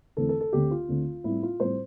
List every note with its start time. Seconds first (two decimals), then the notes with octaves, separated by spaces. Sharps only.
0.17 E2 D3 A3 C4 A4
0.29 A4
0.41 A4
0.53 D2 D3 A3 C4 G4
0.71 F4
0.88 D2 D3 A3 C4
1.24 A2 G3 C4 E4
1.43 F4
1.60 A2 G3 C4 C5